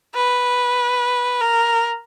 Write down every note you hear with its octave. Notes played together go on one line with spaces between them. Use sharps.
B4
A#4